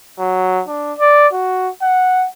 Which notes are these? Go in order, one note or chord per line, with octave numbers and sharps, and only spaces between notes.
F#3
D4
D5
F#4
F#5